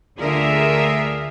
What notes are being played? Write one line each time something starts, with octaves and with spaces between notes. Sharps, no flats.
D2 D3 F4 G#4 A#4 E5